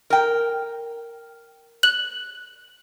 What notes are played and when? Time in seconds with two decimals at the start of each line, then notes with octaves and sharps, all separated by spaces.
0.10 A#4 G5
1.83 F#6 F#7